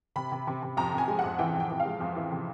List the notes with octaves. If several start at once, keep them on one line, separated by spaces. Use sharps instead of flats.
C3 B5
C3
C3
C3
F2 A#5
C3
G#5
G#3
F2 F#5
E3 G5
F2
G5
E3
F5
G#3
F2
E3
C3